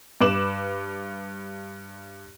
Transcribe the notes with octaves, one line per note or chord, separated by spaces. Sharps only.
G2 B4 D6 E7 F#7